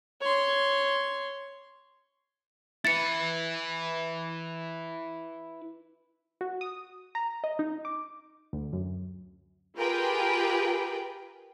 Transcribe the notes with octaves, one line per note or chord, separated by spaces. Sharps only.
C#5 C6
E4 B4 A6 C#7
F#4
D#6
A#5
D#5
D#4
D6
D2
F#2
F4 G4 G#4 A#4 B4 G5